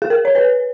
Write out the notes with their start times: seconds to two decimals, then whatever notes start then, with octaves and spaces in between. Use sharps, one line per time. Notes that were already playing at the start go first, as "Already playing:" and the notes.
0.02 G#4
0.10 A#4
0.25 C#5
0.35 B4